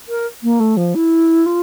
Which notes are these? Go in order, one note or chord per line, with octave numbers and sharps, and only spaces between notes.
A#4
A#3
A3
F3
E4
F4